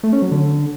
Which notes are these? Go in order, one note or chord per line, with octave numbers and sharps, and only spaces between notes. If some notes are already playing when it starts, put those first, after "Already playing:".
A3
C#4
F#3
D3